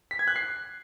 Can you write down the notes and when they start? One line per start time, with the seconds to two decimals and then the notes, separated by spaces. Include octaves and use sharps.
0.11 B6
0.19 G#6
0.28 F#6
0.36 C7